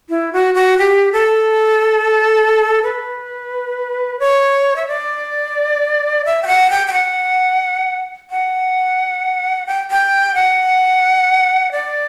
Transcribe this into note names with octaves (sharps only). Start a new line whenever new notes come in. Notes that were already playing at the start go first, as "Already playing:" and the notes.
E4
F#4
F#4
G4
A4
B4
C#5
E5
D5
E5
G5
F#5
G5
G5
F#5
F#5
G5
G5
F#5
D5